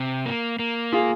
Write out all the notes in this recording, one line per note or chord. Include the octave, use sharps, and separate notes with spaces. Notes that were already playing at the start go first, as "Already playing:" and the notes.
Already playing: C3
A#3
A#3
F4 G#4